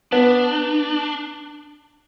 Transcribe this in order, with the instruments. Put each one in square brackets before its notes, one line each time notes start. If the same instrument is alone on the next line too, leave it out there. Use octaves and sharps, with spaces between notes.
[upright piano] B3 [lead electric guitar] D4